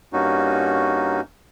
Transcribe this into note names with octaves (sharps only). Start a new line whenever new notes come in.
G2 A#3 C#4 D#4 F#4